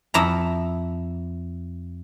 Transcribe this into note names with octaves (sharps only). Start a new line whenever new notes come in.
F2 E4 A#5